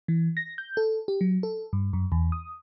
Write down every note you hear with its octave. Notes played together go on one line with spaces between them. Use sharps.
E3
A#6
G6
A4
G4
F#3
A4
G2
F#2
E2
D#6